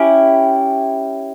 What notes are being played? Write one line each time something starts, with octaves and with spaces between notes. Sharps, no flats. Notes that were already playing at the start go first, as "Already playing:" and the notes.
Already playing: C#4 E4 G4